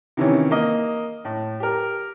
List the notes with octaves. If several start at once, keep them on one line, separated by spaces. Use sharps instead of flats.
C3 D#3 E3 C#4
A#3 D#5
A2
G4 A#4